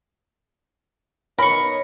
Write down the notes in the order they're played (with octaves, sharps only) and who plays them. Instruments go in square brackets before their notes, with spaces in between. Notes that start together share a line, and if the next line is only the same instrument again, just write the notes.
[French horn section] B3 D#4 C#5 [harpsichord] A#4 C#6 [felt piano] B5